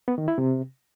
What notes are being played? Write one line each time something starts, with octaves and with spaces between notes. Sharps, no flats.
B3
D#3
E4
C3